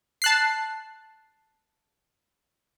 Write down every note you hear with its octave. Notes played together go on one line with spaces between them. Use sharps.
A5 F#6 C7